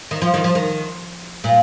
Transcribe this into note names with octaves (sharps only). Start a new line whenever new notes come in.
D#3
F3
D#3
F3
D#3
A#2